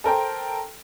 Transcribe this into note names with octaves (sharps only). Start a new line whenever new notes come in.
A4 A#4 C5 G5